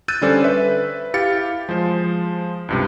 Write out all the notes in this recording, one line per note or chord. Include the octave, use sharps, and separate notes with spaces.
E6 F#6 G6 A6 D#7
D3 G3 C#4 A4 C5 D5
B4 E5
E4 G4 F5 A6 C#7
F3 G#3 C5
C#2 G2 C3